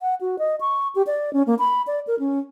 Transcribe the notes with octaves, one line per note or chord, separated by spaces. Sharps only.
F#5
F#4
D#5
C#6
G4
D5
C#4
A#3
B5
D5
A#4
C#4